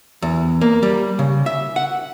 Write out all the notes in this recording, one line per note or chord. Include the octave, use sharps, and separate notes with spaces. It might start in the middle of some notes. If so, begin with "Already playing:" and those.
E2
A#3
G3
C#3
E5
F#5